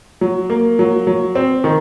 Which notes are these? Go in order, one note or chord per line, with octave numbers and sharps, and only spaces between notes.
F#3
A#3
F#3
F#3
C4
D#3